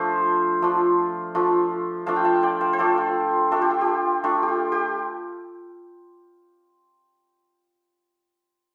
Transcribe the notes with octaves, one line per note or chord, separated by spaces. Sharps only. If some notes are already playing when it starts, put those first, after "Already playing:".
Already playing: F3 A3 D4 F4 C5 F5
F3 A3 D4 F4
F3 A3 D4 F4
F3 A3 D4 F4 F5 A5
G5
F5 A5
D5 G5
C5 F5
C5
A3 D4 F4 A4 D5
F4
A3 D4 F4 A4
G4
F4
G4
A3 D4 F4
G4
F4
G4